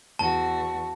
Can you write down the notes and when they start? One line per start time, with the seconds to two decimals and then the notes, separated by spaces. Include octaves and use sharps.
0.19 E2 F#4 A5